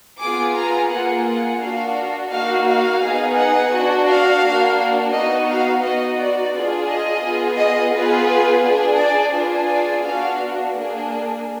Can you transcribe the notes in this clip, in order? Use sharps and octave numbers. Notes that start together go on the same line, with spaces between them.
B3 F4 G#4 D6
A#5
A#3 F4 G#4 F#5
F#5
D4 F#4 F5
A#3 D#4 F#4 F5
F5
B3 D#4 G#4
F#5
D4 F#4
F5
A#3 D4 F#4
B3 D#4 F#4 D#5
F5
B3 D#4 F#4 D#5
D5
D4 F4 G#4
D#5
B3 F4 G#4
D#5
B3 F4 G#4 B4
D4 G#4
D5
D4 F4 G#4 B4
D5
B3 D4 F#4 F5
A#3 D4 G#4